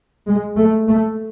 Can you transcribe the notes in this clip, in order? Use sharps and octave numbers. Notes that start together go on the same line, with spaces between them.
G#3
A3
A3